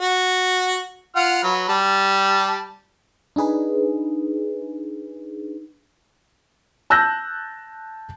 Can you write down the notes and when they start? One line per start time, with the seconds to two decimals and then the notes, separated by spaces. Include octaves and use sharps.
0.01 F#4
1.16 F4 F#5 F6
1.44 F#3 B4
1.69 G3 A5
3.36 D4 D#4 G#4 B4
6.90 A5 E6 F#6 G6 A#6